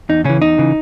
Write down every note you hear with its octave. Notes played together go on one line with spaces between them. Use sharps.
E2 D#4
C#3 E3 C#4
E2 D#4
C#3 E3